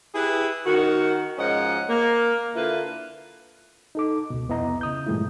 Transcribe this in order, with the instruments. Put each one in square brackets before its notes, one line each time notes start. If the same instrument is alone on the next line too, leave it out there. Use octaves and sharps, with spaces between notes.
[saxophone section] E4 G4 G#4 B4
D#3 F#4
G#2 F3 C#4 D#5 F#5
A#3
D3 A#3 E4 F4 B4
[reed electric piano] D#4 A4 D6
C#2 B2
C2 F2 B3 E4 D#5 A#5
C#3 D#6 G6
G2 A#2 E3 G#3 A3 E4